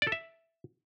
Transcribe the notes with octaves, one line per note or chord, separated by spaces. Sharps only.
D5
A4
E5